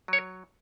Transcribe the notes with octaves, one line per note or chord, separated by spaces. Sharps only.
F#3 C#5